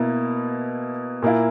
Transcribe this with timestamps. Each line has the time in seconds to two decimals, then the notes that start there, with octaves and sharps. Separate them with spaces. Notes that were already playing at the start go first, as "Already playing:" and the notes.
Already playing: B2 A#3 E4
1.22 A#2 A#3 E4